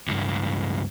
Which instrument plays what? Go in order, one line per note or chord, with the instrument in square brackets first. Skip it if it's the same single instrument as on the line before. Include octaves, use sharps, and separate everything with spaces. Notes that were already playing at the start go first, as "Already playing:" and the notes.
[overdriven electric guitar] C#2 G2